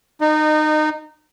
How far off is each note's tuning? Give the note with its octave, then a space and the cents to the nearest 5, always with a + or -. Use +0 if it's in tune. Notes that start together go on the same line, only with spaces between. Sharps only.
D#4 -20 D#5 -35